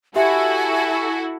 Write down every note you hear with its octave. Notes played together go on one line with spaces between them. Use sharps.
E4 F#4 G4 A4 E5 G#5